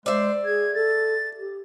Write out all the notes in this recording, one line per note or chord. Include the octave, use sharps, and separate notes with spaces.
G#3 C5 D5 E5
G#4 G#6
A4 A6
G4